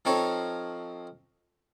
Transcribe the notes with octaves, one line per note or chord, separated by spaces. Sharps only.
F3 C4 D#4 A4 C#5